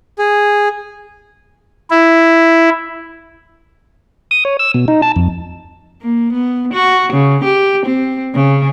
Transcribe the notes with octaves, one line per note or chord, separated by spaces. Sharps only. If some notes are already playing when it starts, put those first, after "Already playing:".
G#4
E4
D#6
C#5
E6
B2
D#4
A5
F2
A#3
B3
F#4
C#3
G4
C4
C#3